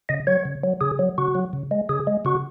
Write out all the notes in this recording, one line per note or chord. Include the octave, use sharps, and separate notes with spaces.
C#3 D#5
F#3 C#5
C#3
F#3
C#3 G#4
F#3
C#3 F#4
F#3
C#3
G#3
C#3 G#4
G#3
C#3 F#4